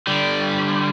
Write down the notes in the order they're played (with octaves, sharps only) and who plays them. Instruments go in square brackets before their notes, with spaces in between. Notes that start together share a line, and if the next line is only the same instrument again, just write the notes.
[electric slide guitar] D3 G3